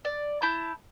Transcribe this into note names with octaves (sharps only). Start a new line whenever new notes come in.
D5
E4 A5 G6